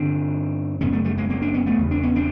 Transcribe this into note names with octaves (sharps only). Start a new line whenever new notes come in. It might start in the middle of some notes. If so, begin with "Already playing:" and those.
Already playing: G2 D3 C4 D4
F#2 C#3 B3 C#4
A3 B3
G3 A3
G#3 A#3
A#3 C4
C4 D4
B3 C#4
A3 B3
E2 C#3
C4 D4
B3 C#4
C4 D4